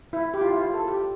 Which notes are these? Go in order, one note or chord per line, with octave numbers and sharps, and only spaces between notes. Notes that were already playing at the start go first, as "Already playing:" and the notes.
E4
G4
F4
E4
F4
A4
G4